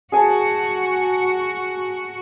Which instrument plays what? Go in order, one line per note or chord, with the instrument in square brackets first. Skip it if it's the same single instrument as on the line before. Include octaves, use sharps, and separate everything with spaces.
[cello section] F#4 [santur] G#4 G#5 A5